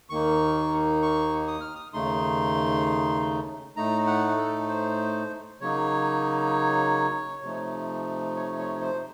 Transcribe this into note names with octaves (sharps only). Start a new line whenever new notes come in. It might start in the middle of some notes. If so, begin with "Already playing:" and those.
D#2 D#3 A#3 D#4 C#6
C#6
D#6
F6
D#6
D#2 C#3 A3 D#4 C6
A2 A3 D#4 A#5
F#5
A4
C5
C#3 F#3 A#3 D#4 C#5
C3 F3 A3 D#4
C#5
C#5
C5